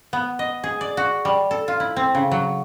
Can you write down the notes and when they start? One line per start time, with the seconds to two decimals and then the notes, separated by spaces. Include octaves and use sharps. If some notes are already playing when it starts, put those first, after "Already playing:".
0.13 B3
0.39 D#5
0.64 G#4
0.81 D5
0.97 F#4
1.25 G3
1.51 A4
1.68 F4
1.80 E4
1.96 C4
2.15 C#3
2.31 F#3